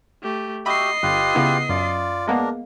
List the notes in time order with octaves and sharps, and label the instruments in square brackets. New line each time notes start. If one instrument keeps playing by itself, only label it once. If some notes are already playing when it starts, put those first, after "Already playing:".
[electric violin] A3 G4
[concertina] F#4 G4 E5 [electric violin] D#5 C7 [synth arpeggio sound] B5
[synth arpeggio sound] G1 [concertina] F4 G4 B4
[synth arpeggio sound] C#3 B3 E4
[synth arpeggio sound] F#2 [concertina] F4 D5
[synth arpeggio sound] G#3 A#3 B3 [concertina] D4 A#4